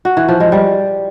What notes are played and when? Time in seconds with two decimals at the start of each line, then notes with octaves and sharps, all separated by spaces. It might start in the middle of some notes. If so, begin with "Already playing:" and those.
0.05 F#4
0.17 E3
0.29 F3
0.40 G#3
0.52 G3